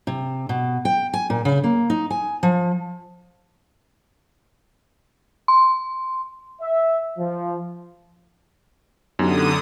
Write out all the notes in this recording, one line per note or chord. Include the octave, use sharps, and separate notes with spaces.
C3
B2
G5
G#5
A#2
C#3
A#3
D#4
G#5
F3
C6
E5
F3
F#2 D3 B3 D#4 G4 D#6